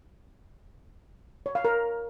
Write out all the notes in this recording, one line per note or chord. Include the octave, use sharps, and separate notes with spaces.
C#5
F5
A#4